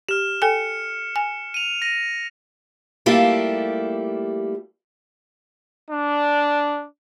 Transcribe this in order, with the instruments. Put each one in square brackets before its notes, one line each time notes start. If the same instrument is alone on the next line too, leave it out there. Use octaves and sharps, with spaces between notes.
[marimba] G4 [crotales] F6 E7
[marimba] A4 G5 G#5 [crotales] C#7
[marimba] G#5
[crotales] D#7 F7
A#6 D#7
[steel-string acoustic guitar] G3 A3 A#3 E4 F4 G4
[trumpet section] D4